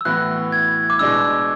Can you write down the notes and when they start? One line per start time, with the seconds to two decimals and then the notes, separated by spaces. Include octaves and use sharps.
0.01 E6
0.05 A2 E3 B3 F#4 F#6
0.52 G#6
0.90 D6
0.99 B2 G#3 D4 E6